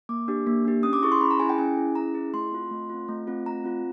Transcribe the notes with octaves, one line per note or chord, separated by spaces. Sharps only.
A#3 D6
D4 G4
A#3
D4 G4
C#4 D#6
D6
E4 G#4 C#6
C6
C#4 B5
A#5
E4 G#4 G#5
G5
C#4 G#5
E4 G#4
C#4 A#5
E4 G#4
A3 C6
C4 F4
A3
C4 F4
A3
C4 F4
A3 A#5
C4 F4